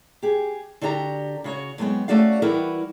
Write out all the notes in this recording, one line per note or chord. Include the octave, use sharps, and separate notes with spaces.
G4 G#4
D3 D4 F#4 G4 D5 A#5
C#3 F#4 C#5
D3 F#3 G#3 B3 C4
A3 C#4 F#4 D5 F5
E3 G3 E4 F#4 A#4 B4